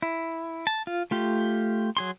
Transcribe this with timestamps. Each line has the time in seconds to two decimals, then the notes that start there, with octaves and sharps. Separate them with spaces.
0.02 E4
0.67 A5
0.87 F4
1.11 A3 F4 G4
1.97 F#3 G#4 C6